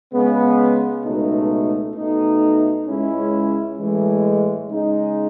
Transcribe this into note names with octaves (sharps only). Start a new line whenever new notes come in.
C#3 G#3 B3
C#2 B2 A3 D#4
B2 A3 D#4
C#2 C#3 G#3 C#4 E4
A2 E3 G#3
C#3 G#3 D#4